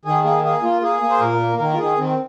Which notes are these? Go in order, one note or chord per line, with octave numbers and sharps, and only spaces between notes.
D#3 G#4
A#3 G#4
A#3 G#4
A#3 F4
A#3 G#4
A#3
C5
A#2 A#4
A#3
D#3 A#4
F4
D#3 G#4
D#3 C4